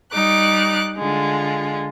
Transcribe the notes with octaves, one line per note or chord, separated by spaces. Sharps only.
G3 D#4 D6 F#6
D3 G#3 F4